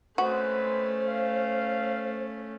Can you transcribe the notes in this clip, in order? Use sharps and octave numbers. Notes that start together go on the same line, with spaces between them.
G#3 A3 C4 C#4 F#4 B4 C5
F5